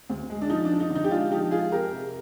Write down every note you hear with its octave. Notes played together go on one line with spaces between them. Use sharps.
D2
G#3
D4
F3 D#4
D4
F3
D#4
D3
D#4
G4
G#3 D4 F4
F3 D#4 G4
G#3 F4 G#4
F2 G4 A#4
C3